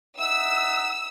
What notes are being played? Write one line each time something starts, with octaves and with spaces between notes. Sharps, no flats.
D#4 E5 F#5 E6